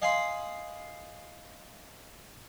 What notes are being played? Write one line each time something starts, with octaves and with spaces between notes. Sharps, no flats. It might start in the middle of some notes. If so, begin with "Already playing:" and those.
D#5 F5 G#5 B5 C6 D#6